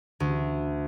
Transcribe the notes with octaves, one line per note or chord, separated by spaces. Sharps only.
D2